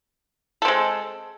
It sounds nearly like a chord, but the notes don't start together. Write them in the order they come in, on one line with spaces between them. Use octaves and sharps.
A4 C4 G#3